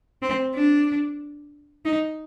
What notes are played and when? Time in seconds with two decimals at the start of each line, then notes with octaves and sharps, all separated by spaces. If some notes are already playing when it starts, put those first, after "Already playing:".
0.22 C4
0.55 D4
1.85 D#4